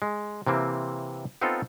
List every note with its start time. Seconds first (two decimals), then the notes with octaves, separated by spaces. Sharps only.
0.02 G#3
0.47 C3 E3 A#3 C4
1.41 B3 C4 D#4 F4 A4